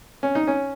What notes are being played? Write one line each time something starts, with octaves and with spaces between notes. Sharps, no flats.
C#4
D#4
C#4